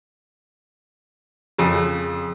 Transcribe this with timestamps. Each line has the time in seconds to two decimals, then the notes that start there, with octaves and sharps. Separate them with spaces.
1.58 F2 C#3